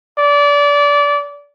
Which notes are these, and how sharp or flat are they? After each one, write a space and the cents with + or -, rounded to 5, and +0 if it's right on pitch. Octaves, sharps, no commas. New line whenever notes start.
D5 -25